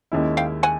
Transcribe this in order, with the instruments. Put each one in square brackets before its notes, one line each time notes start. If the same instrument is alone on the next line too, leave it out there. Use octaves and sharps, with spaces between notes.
[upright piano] D#2 D#3 G#3 C#4 E4
[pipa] F5 G5
F#5 G#5